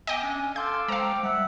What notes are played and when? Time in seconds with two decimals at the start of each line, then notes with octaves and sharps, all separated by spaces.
0.07 B3 D#5 G5 G#5 D6
0.23 C#4 D4
0.56 A4 F5 C6 D6 F6 G6
0.88 G#3 C5 F5 G5 A#5
1.23 G3 E5 F#5